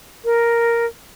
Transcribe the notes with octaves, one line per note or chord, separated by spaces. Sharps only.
A#4